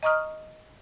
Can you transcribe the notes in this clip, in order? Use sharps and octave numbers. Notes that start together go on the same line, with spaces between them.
D#5 A#5 C#6 D#6 F6